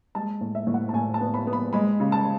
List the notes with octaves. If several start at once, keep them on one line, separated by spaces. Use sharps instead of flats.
G#3 A5
A2
E5
A2
F#5
A5
A2 G#5
A5
B3
B5
B3
B5
G#3 B5
C#3
A5